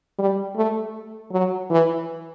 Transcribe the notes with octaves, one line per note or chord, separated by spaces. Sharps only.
G3
A3
F#3
E3